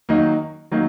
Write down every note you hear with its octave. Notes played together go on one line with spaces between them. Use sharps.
D#3 F#3 A#3 D#4
D#3 F#3 A#3 D#4